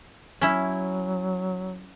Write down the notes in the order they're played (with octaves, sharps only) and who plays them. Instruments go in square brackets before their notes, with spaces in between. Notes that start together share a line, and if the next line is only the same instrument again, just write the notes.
[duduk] F#3 [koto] C#4 E4